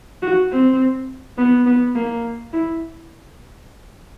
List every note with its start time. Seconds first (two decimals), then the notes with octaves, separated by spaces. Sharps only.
0.22 F#4
0.51 C4
1.37 B3
1.66 B3
1.95 A#3
2.53 E4